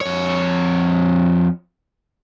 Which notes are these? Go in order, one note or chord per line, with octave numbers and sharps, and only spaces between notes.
F2 C#5